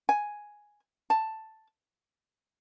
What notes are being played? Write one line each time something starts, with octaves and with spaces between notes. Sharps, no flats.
G#5
A5